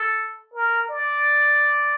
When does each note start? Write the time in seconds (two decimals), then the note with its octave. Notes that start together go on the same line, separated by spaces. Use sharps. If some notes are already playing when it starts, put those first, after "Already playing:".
Already playing: A4
0.54 A#4
0.89 D5